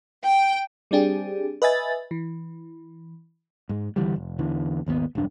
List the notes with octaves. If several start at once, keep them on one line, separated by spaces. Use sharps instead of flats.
G5
G3 C4 D4 G4 G#4
B4 D#5 E5 G#5 A6
E3
G#2 G#3
C#2 D3 E3 G3
F1
E2 D3 E3
G#1 D#2 B2 B3
E1 B1 G2 D4